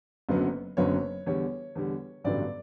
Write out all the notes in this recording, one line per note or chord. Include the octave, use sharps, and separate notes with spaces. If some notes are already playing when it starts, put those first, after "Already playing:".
F#1 F#2 D3 F#3 B3
F#1 F#2 D3 F#3 B3 C#5
E2 D3 G3 C#5
E2 D3 G3
A1 G2 D3 F#3 B3 D5